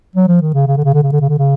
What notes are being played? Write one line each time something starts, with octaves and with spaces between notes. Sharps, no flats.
F#3
F3
D#3
C#3
C#3
D3
C#3
D3
C#3
D3
C#3
D3
C#3